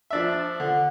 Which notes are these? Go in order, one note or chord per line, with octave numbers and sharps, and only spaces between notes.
F3 D4 E5
D3